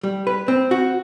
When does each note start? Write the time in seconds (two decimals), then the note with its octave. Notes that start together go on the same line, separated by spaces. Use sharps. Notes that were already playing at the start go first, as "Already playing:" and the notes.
0.03 G3
0.27 B4
0.48 C4
0.71 F#4